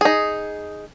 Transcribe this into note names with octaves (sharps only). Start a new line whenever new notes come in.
D#4 G#4